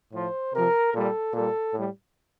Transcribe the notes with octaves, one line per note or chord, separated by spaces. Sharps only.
A2 F3 C5
C3 F3 A#4
A#2 G3 A4
A#2 G3 A4
A2 G3